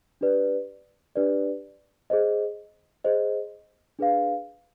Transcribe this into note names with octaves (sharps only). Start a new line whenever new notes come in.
D4 G4 B4 D5
D4 G4 B4 D5
G#4 C5 D#5
G#4 C5 D#5
D4 G#4 B4 F5